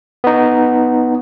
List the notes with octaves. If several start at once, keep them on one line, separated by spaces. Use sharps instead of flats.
B3 D#4